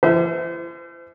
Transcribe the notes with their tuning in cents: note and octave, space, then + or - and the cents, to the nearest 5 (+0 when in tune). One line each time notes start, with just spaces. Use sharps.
E3 +45 C5 -35 E5 -25